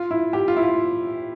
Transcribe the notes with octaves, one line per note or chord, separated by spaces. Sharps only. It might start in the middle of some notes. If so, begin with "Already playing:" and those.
Already playing: F4
E4
G4
F4
E4
F4